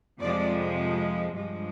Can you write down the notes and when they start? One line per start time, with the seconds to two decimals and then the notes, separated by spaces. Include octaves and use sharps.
0.19 F2 C3 F3 G#3 D5
1.32 G2 F3 G#3